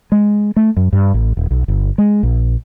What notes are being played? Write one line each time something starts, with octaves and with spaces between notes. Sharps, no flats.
G#3
A3
F#2
G2
A1
D#1
B1
G1
G#3
A#1